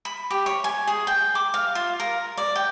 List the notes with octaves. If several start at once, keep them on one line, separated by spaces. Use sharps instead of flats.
B5
G4
C#5
G#5
G#4
G5
D6
F5
F4
A#4
D5
G5